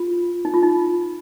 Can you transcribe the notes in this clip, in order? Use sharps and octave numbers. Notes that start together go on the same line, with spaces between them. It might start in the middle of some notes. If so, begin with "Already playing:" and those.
Already playing: F4
D#4
F4
D#4